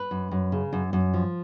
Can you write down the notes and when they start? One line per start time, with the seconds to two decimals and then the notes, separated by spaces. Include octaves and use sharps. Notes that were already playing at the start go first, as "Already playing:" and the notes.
Already playing: B4
0.11 F#2
0.31 F#2
0.52 C#3
0.73 F#2
0.93 F#2
1.14 F3